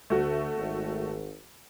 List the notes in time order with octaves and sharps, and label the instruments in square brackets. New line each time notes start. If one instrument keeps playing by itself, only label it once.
[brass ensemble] D2 [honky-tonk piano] A3 F#4
[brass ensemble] G#1